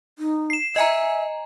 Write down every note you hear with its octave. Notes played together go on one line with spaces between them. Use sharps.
D#4
C7 E7
D#5 E5 G#5 A#5